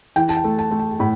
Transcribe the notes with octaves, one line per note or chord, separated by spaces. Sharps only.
E3 G5
A5
G5
A3
A5
A3
A5
A2 B5